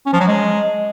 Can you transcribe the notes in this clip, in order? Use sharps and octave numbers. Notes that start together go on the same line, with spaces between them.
C#4
F3
F#3
G#3